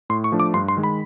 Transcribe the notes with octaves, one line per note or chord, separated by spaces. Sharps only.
A2 C6
C#6
F3 A3 D4
D6
G2 C6
C6
D#3 G#3
B5